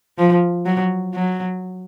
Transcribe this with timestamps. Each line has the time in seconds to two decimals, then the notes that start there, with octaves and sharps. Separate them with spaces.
0.18 F3
0.66 F#3
1.14 F#3